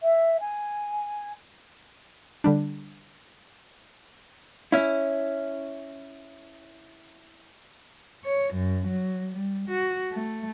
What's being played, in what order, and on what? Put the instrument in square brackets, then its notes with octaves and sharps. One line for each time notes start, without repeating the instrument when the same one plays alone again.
[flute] E5
G#5
[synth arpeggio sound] D3 G3 D4
[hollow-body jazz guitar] C#4 E4
[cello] C#5
F#2
F#3
G3
F#4
A3